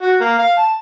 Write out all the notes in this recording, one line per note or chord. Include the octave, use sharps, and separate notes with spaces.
F#4
A#3
F5
A5